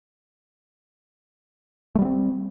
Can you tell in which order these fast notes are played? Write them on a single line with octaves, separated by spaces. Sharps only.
A3 G3 B3 C4